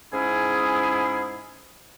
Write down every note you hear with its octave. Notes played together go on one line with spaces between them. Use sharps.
G#2 C#4 E4 G#4